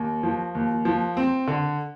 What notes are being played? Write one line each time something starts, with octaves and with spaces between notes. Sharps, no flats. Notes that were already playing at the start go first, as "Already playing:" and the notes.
Already playing: D#2
F3
D#2
F3
C4
D3